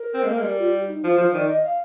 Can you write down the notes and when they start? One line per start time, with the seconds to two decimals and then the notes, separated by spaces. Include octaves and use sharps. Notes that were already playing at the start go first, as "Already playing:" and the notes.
Already playing: A#4
0.14 C4
0.23 G#3
0.28 A#3
0.38 G#3
0.43 G3
0.59 F4
0.73 G4
0.88 D#4
1.04 F3 F4
1.18 F3 C5
1.33 D#3 D5
1.49 D#5
1.64 F5